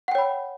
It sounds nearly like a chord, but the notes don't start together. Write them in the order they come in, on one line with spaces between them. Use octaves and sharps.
F#5 G5 C#5 B5